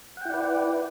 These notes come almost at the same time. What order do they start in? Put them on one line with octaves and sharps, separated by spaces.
F#5 G5 E4 D5 B4